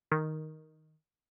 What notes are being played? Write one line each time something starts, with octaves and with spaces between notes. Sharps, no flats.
D#3